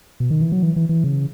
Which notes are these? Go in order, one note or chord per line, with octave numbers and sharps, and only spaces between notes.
B2
D#3
E3
F#3
E3
E3
E3
C#3